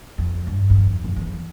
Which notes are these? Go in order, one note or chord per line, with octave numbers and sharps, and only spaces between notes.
F2
G2
E2
F2
F2
E2